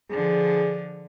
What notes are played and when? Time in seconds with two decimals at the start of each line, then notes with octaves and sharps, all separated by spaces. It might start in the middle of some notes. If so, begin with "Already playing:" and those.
0.11 D3 F3 G#4